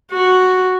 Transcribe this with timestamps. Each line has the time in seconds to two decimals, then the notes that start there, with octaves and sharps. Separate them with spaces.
0.12 F#4